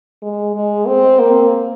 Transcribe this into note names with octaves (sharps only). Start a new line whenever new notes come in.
G#3
G#3
C4
A#3